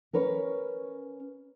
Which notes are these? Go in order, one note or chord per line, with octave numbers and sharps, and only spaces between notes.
C#4 A#4 B4 C#5